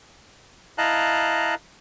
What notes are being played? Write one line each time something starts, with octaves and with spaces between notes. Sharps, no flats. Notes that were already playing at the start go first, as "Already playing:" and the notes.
E4 D#5 F5 A5 A#5 F#6